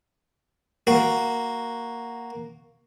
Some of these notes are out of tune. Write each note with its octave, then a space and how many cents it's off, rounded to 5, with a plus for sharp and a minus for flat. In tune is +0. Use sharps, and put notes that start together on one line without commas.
A#3 +0 F#4 +0